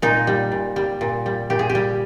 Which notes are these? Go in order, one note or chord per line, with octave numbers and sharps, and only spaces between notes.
A#2 D#4
G3
A#2
G3
A#2
G3
A#2 G4
G#4
G4
G3